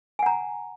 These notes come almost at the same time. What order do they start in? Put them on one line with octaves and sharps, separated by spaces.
G#5 F#5 A#5